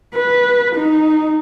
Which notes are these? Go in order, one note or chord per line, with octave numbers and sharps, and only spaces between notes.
B4
D#4